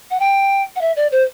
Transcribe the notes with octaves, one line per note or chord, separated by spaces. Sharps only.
F#5
G5
F#5
E5
D5
C5